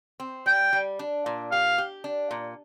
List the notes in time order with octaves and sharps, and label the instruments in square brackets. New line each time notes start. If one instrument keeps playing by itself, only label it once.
[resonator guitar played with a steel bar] C4
[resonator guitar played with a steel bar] G3 [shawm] G5
[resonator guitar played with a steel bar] G3
D4
A#2
[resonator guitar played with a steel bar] G4 [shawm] F5
[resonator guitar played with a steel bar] G4
D4
A#2